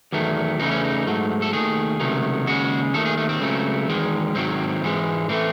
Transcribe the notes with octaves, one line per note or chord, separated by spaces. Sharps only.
E2 D#3 F#3 A3
E2 C#3 E3 A3 D#4
C#4
D#4
G#2 F#3 A3
A4
D#2 D#3 A3 G#4
C#2 C3 D#3 F#3 A3
D#2 C#3 G#3 F#4
D#2 D#3 A3 A4
G#4
A3
C4
C#2 C#3 F#3 A3
E2 D#3 G#3
G#2 D#3 F#3 C4
G#2 E3 G#3
A2 E3 A3 C4